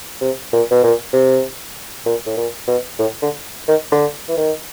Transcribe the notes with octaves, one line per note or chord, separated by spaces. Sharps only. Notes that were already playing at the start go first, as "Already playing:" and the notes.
C3
A#2
B2
A#2
C3
A#2
A2
A#2
B2
A2
D3
D#3
D3
E3
D#3